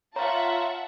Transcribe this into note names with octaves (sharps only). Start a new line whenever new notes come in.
F4 C#5 E5 F#5 A5 A#5